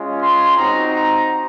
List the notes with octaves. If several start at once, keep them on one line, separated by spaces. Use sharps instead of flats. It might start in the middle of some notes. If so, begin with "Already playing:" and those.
Already playing: G#3 C#4 F4
C6
C4 D#4 F#4 A#5
A#5